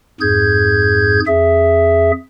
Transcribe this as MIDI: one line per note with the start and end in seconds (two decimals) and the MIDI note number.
0.21 1.20 41
0.21 1.20 44
0.21 1.20 68
0.21 1.20 91
0.21 1.20 92
1.27 2.11 41
1.27 2.11 68
1.27 2.11 76